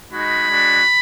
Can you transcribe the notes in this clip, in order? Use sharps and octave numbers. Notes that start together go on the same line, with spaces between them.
G#3 D#4 F#4 B5
G#3 D4 F#4